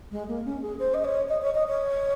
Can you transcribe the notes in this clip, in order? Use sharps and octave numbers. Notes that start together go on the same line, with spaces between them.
G#3
A#3
C#4
G#4
C5
D#5
C#5
D#5
C#5
D#5
C#5